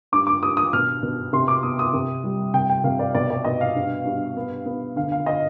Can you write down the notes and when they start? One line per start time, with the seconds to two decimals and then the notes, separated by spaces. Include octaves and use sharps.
0.12 G2 D6
0.27 D6
0.42 G2 D#6
0.57 D#6
0.73 B2 F6
1.03 B2
1.33 C3 C6
1.48 D6
1.63 B3 D#6
1.79 D#6
1.93 C3
2.24 G3
2.54 C3 G5
2.70 G5
2.84 C3 F5
2.99 D5
3.15 B2 D5
3.30 D5
3.45 B2 D#5
3.61 F5
3.75 G2
4.05 G2
4.36 B3
4.66 B3
4.96 D3 F5
5.12 F5
5.26 D#5